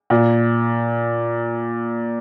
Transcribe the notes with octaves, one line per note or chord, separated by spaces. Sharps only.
A#2